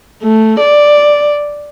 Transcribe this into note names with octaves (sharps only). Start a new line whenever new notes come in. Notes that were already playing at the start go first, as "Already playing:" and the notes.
A3
D5